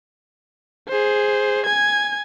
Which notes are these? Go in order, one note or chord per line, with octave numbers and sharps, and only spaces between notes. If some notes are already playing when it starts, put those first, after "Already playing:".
G#4 C5
G#5 G#6